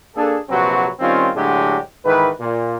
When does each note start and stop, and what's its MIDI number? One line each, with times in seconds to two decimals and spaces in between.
0.15 0.37 58
0.15 0.37 62
0.15 0.37 68
0.15 0.37 69
0.49 0.89 34
0.49 0.89 48
0.49 0.89 54
0.49 0.89 60
0.49 0.89 66
0.49 0.89 71
0.99 1.28 51
0.99 1.28 55
0.99 1.28 60
0.99 1.28 61
0.99 1.28 65
1.35 1.77 45
1.35 1.77 50
1.35 1.77 54
1.35 1.77 56
1.35 1.77 62
1.35 1.77 67
2.05 2.28 44
2.05 2.28 51
2.05 2.28 52
2.05 2.28 71
2.40 2.76 46